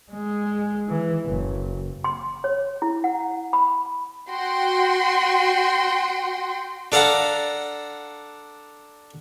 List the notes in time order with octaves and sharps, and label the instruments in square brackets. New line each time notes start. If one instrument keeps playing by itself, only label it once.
[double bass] G#3
E3
F#1
[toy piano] C6
C#5
E4
F#5
B5
[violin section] F#4 G5 C6
[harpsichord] D4 A4 F5 F#5 A#5